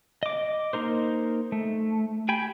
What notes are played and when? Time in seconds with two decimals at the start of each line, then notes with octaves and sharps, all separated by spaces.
0.23 D#5 D6
0.73 A#3 D#4 A#4 C5
1.52 A3
2.29 G4 G5 G#5 B5